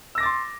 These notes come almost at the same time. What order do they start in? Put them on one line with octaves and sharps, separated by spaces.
E6 A#6 D6 A6 C6